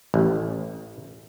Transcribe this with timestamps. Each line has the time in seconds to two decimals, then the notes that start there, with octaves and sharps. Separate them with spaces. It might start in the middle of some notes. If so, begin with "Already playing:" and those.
0.14 A1